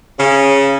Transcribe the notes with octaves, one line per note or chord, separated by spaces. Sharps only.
C#3